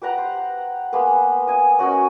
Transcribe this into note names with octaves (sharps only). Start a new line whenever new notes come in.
G4 B4 F#5 A#5
C5
G#3 A#3 B3 B4
D#5 G#5
C#4 F#4 A#4 D#5